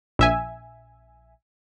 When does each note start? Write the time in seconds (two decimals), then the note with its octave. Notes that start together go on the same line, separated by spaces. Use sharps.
0.19 A#1 E5 G#5